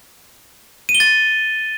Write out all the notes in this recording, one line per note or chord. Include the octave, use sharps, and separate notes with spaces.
D#7
G7
A6